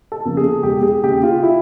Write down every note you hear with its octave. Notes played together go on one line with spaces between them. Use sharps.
A4
E2 C#3 F3 A#3
G#4
E1 G4
G#4
D#2 C#3 G4
F4
E4